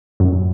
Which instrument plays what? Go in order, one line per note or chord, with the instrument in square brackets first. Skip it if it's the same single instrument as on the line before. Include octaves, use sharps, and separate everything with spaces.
[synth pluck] F#2